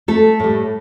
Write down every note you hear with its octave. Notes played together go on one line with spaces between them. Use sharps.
A3 A4
A2 G3